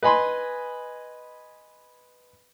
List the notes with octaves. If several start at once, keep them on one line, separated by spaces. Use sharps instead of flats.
B4 D#5 G#5 B5 C6